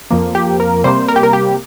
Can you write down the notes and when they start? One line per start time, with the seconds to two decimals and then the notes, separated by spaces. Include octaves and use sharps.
0.11 F2 F3 A#3
0.35 G4
0.60 A#4
0.84 C3 G3 A#3 C5
1.08 A#4
1.16 G4
1.23 A#4
1.33 G4